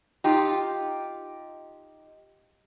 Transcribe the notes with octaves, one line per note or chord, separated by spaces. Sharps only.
D#4 F4 G4